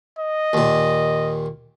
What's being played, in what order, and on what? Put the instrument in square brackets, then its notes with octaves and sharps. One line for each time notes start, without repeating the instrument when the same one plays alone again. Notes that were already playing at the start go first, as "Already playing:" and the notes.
[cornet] D#5
[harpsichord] D#2 A#2